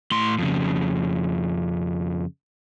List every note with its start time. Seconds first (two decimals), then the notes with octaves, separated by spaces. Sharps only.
0.11 A2 C6
0.38 F2 C#3